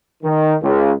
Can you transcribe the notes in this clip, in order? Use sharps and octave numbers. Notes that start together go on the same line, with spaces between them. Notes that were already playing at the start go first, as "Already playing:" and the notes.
D#3
C#2